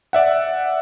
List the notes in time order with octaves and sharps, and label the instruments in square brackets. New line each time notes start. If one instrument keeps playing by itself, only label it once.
[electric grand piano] D5 E5 F#5